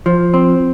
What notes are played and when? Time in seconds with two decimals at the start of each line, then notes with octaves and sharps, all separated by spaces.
0.06 F3
0.34 C4